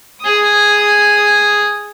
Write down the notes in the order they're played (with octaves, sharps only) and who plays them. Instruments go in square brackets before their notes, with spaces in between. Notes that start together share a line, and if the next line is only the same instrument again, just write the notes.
[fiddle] G#4 D#6